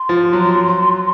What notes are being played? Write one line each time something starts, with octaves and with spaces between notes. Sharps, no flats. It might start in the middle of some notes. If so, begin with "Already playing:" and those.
Already playing: C6
F3
F#3
F#3